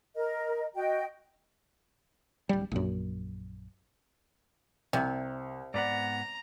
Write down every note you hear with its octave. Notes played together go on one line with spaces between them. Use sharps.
A#4 D#5
F#4 D#5 G5
D1 G3
A#1 F#2
C2 C3
G#2 B3 D5 F#5 A#5